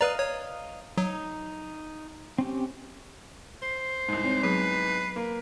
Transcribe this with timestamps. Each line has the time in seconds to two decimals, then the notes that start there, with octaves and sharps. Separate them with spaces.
0.01 B4 D5 D#5 F5 A#5
0.19 C#5
0.98 F#3 D#4
2.38 C4 C#4 G4
3.62 C5 C7
4.09 C2 G#2
4.24 C4 C#5
4.43 F#3 B3 G#4 B4
5.16 A#3